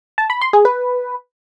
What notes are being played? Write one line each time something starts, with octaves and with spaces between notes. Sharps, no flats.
A5
B5
C6
G#4
B4